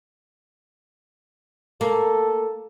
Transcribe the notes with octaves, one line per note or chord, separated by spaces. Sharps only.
A#3 A4